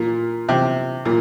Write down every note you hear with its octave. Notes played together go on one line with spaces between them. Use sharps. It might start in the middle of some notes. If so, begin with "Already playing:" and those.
Already playing: A#2
C3
A#2